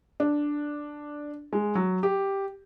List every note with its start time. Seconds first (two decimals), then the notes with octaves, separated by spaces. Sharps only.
0.20 D4
1.53 G#3
1.75 F#3
2.03 G4